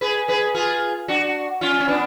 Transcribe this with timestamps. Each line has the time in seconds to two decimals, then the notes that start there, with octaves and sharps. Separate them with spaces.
0.01 G#4 B4
0.28 G#4 B4
0.54 F4 G#4
1.08 D4 F#4
1.61 C#4 F4
1.80 C#4
1.88 B3 D4